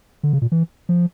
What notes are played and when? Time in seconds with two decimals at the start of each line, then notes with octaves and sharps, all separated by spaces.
0.23 D3
0.33 C#3
0.42 A#2
0.52 E3
0.89 F3